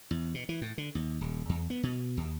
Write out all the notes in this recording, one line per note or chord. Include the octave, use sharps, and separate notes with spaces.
E2
B2
E3
A2
D3
D#2
D#1
E2
B3
B2
D#2